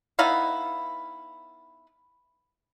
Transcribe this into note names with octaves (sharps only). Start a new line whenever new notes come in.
B3 D#4 E4 F5